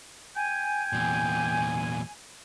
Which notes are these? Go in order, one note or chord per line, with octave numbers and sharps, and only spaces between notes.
G5 G#5
E2 A#2